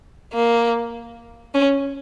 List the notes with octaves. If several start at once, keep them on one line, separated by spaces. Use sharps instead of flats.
A#3
C#4